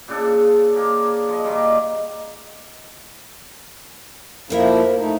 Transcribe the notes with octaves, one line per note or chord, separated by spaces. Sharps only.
A#2 C#3 D4 A4
A#3 G4 G#4 A#4
F3 D#5
A#2 D#3 G3
F2 F3 A#3 E4 A#4 E5
A3 D#4